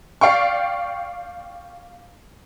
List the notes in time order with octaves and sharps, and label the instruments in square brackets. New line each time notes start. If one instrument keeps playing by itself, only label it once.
[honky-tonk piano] D5 F5 G5 C#6